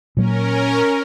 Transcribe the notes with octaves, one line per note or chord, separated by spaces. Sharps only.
A#2 F#3 A#3 C#4 A#4